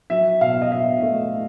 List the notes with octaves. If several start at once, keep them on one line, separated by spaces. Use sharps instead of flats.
F#3 E5
B2 F5
D#5
B2 E5
A3